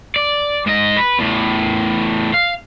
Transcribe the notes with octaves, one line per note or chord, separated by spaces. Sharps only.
D5
G#2 D#5
B4
E2 A2
F5